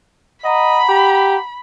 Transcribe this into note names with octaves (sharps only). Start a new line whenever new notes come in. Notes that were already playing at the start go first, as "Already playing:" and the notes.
D#5 F#5 A#5 B5
G4